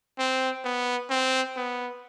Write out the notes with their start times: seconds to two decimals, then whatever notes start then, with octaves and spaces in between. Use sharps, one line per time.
0.19 C4
0.65 B3
1.10 C4
1.56 B3